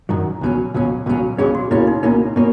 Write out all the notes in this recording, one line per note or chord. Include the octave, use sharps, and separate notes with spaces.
F#2 D#3 F#3
C#2 B2 F#3 C#4
C#2 B2 F#3 C#4
C#2 B2 F#3 C#4
C#2 B2 F#3 C#4 G#4
F#4
C#2 B2 A#3 C#4 E4
D#4
C#2 B2 A#3 C#4
B2 A#3 C#4